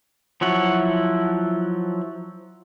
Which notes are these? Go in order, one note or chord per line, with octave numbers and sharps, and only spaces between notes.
F3 F#3 E4 F#5